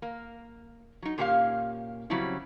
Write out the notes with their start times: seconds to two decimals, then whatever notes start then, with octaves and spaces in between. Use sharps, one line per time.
0.02 A#3
1.02 F#3 D#4
1.18 A#2 A#3 C#4 G4 B4 F5
2.10 C#3 F#3 G3 C4 C#4 E4